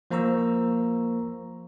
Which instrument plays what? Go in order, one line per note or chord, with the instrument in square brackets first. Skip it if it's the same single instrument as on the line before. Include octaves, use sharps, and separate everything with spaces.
[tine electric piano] F3 A#3 C5 A#5 C#6 E6